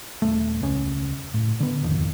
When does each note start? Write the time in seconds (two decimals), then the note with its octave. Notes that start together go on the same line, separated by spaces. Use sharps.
0.22 D#1 F2 A3
0.61 E1 C#2 A#2 C#4
1.34 A2
1.60 D3 B3
1.82 D#1 G#1 F2 D#3